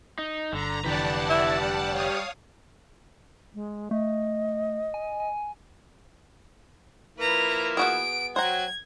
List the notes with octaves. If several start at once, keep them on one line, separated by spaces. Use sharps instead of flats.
D#4
G1 D3 A#5
F1 D3 E3 G4 B4 D5 F#5 A5
E4
G3
C#5 F5 D#6
G#3
A3 D#5
G#5
G#5
F3 A#3 E4 B4 A#5
B3 F#4 G#4 D7
F#3 C5 F#5 G5 A#5 G#6